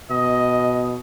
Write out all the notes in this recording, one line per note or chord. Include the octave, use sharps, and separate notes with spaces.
B2 D#5